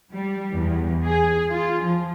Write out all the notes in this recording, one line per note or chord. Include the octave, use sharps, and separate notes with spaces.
G3
E2
G#4
F4
F3